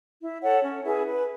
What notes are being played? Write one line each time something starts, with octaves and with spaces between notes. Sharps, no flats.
E4
A4 C#5 F#5
C#4
E4 G#4 B4
B4